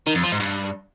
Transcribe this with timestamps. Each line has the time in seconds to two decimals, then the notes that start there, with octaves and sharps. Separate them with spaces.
0.07 D#3
0.15 F2
0.23 F3
0.32 G#2
0.40 G2